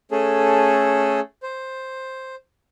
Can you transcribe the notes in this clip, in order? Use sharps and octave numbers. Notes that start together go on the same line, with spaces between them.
A3 C#4 G#4 A4
C5